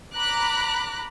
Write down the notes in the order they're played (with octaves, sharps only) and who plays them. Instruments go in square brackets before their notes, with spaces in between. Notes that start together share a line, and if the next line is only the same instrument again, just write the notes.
[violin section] A#5 B5 D6 F#6